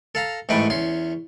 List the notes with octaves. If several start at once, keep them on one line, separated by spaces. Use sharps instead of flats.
A4 F5 A#5
A1 G#2 A3 B4 G5 C#6
E2 C#4 C6